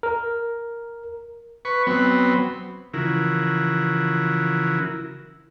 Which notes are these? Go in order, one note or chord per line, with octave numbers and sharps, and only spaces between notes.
A#4
B4 C#6
F#3 B3 C4
C#3 E3 F3 E4 F#4 A#4